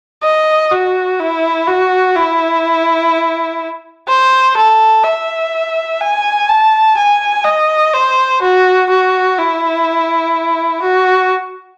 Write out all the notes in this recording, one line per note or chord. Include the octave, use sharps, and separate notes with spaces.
D#5
F#4
E4
F#4
E4
C5
A4
E5
G#5
A5
G#5
D#5
C5
F#4
F#4
E4
F#4